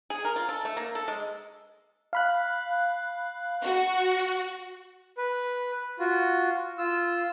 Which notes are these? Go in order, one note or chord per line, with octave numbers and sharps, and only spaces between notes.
G#4
A#4
F4
A4
A3
A#3
A4
G#3
F5 B5 F#6
F#4
B4
F4 F#4
F4 E6